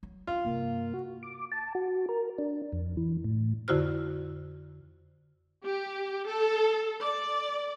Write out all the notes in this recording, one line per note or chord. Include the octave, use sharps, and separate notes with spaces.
F#3
D#3 C#4 F4
G2 C3 A#3
F#4
D6
A5
F#4
A#4
D4
F2
E3
A2
F2 D3 E4 F#4 C5 F6
G4
A4
D5